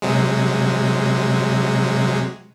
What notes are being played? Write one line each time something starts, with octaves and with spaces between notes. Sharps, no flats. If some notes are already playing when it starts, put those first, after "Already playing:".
C3 F#3 G#3